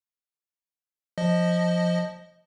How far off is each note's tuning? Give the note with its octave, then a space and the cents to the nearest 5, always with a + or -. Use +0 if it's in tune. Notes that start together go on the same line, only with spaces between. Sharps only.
F3 +5 D#5 +0